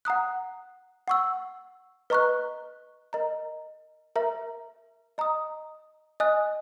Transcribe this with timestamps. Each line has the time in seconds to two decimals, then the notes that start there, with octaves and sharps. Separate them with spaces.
0.05 F#5 A#5 D#6 F#6
1.08 F#5 C#6 E6
2.10 B4 D#5 A#5 C#6 F#6
3.13 A#4 D#5 A#5
4.16 A#4 E5 A#5
5.18 D#5 A#5 D#6
6.20 D#5 G#5 D#6 F#6